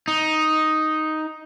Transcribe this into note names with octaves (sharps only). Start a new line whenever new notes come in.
D#4